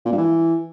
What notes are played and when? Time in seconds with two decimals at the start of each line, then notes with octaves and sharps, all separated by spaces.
0.05 A#2
0.12 G2
0.18 E3